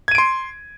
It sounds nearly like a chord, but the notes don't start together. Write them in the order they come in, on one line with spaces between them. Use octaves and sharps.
G#6 D#7 D7 C6